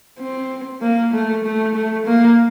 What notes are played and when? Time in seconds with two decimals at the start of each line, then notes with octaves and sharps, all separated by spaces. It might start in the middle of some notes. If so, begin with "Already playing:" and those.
0.19 C4
0.82 A#3
1.13 A3
1.44 A3
1.75 A3
2.06 A#3